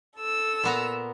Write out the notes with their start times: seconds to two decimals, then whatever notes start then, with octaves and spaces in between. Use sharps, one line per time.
0.17 A4 E6
0.64 A#2 B3 A#5